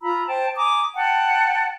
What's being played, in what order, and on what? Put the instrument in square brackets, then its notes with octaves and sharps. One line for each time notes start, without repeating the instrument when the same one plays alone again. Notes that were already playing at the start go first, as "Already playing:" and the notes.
[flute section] F4 A#5 B5 E6
C5 G5 A5
G#5 A#5 D6 D#6
F#5 G5 A5